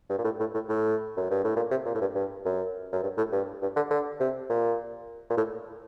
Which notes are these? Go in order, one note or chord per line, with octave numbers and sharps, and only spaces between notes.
G2
A#2
A2
A2
A2
A2
F#2
G2
A2
A#2
C3
A#2
A2
G2
G2
F#2
F#2
G2
A2
G2
G2
D3
D3
C3
A#2
A#2
A2